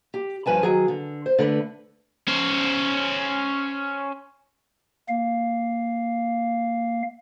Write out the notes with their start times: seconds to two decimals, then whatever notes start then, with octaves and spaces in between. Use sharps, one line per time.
0.14 G4
0.46 G2 F3 B4 G#5 A5
0.63 D#3 E3 F#3 G#4
0.88 D3
1.26 C5
1.39 D3 A3 B4
2.28 C#4 C5
5.09 A#3 F5